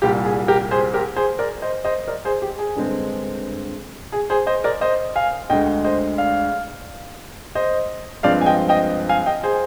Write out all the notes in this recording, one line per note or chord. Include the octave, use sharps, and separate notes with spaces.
C2 A#2 G3 G4
G#4
G4 A#4
G#4 C5
G4 A#4
G#4 C5
A#4 D5
C5 D#5
C5 D#5
A#4 D5
G#4 C5
G4
G#4
G2 D3 G#3 C4
G#4
G#4 C5
C5 D#5
A#4 D5
C5 D#5
F5 G#5
D2 D3 G#3 D#5 G5
C5 D#5
D5 F5
C5 D#5
G2 F3 G#3 C4 D5 F5
G#5
D#5 G5
D#5 G5
F5 G#5
D#5 G5
G#4 C5